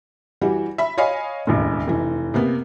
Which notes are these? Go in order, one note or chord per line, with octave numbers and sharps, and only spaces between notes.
E3 G3 F#4
E5 B5
C#5 D#5 F5 G#5 B5
E1 A1 D#2
F1 E3
C3 A#3 B3